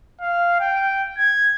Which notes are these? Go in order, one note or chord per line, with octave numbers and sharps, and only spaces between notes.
F5
G5
G#6